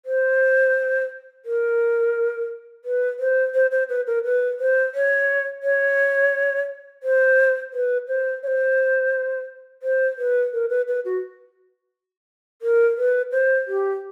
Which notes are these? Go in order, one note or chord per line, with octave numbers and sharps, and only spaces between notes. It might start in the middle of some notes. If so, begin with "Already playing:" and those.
C5
A#4
B4
C5
C5
C5
B4
A#4
B4
C5
C#5
C#5
C5
B4
C5
C#5
C5
C5
B4
A#4
B4
B4
F#4
A#4
B4
C5
G4